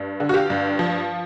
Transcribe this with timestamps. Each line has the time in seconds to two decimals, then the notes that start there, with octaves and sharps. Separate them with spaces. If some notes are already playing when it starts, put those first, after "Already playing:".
Already playing: G2
0.20 D3
0.29 F#4
0.34 F4 G4
0.50 G2
0.79 F3